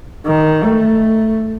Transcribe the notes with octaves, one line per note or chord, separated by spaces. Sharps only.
D#3
A3